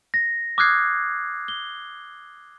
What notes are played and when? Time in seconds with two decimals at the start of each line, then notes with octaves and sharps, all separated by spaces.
0.14 A#6
0.58 D6 D#6 F6 F#6 G#6 C7
1.48 G7